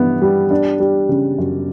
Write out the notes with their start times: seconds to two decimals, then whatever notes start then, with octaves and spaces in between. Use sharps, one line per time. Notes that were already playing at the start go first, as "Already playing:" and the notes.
Already playing: G2 E3 B3
0.22 G3
0.51 D4
0.80 G3
1.09 C#3
1.38 F#2